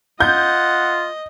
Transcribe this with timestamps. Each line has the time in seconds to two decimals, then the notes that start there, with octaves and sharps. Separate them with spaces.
0.20 F4 D#5 F#5 G6